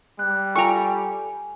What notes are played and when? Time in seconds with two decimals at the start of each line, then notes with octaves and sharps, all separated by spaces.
0.19 G3 F#6
0.55 F4 A4 G5 G#5 A#5 C#6